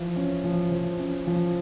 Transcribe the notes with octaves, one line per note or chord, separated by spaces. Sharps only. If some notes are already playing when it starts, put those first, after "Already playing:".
Already playing: E3 F3
C#4
F3
F3
C#4
F3